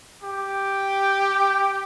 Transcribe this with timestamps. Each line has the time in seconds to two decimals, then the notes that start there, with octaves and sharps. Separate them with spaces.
0.24 G4